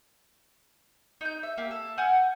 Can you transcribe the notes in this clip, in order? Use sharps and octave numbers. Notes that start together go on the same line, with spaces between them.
D#4 G6
E5
A#3 G4
A4
F#5 G#5 F6 G6